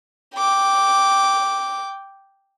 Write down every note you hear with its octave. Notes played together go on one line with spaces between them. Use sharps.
G5 D6